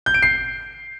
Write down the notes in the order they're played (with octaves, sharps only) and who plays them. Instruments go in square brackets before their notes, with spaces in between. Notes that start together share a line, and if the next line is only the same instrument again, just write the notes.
[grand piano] G6
D7
C7